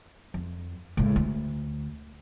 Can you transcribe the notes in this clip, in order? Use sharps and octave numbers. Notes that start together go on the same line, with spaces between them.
F2
C#2 A2
D2